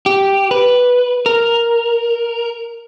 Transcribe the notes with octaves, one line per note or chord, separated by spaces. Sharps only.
G4
B4
A#4